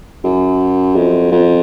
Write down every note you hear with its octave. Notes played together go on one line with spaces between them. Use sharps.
F#2
F2
F2